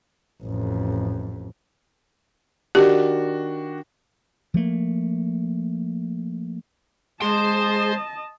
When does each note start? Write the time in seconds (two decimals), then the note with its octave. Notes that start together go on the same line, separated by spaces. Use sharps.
0.43 A1 F2
2.75 D#3 D4 F#4 G4
4.54 F3 G3 A3 A#3
7.22 G#3 G#4 C5 D#5 A5 C6